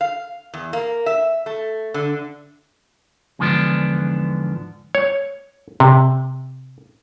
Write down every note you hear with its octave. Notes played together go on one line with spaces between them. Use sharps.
F5
E2
A#3
E5
A3
D3
E2 G#2 D3 F3 B3 D4
C#5
C3